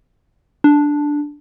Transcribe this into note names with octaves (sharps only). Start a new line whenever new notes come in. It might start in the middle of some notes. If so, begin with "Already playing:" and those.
D4